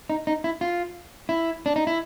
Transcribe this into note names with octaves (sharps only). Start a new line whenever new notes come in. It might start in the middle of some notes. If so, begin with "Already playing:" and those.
D#4
D#4
E4
F4
E4
D4
D#4
E4